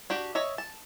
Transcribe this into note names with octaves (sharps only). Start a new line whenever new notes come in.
D4 F#4 G4
C#5 D#5 E5
A5